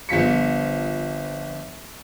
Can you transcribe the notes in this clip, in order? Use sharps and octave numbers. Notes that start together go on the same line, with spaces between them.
G1 F3 B6 C#7